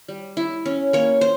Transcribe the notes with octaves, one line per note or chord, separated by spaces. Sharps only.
G3
E4
C#4
A#3 C#5
C5